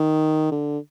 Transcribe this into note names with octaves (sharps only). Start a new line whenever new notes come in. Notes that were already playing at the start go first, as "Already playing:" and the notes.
Already playing: D#3
D3